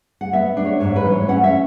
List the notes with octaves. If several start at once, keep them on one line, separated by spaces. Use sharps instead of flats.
F#5
B3 E5
D4
C#5
G#2 C#5
B4
E3
C#5
C#4 F#5
E5